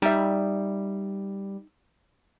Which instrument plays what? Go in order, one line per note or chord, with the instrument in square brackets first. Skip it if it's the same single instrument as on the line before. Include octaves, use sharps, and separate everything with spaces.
[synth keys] G3 [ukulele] D#4 E5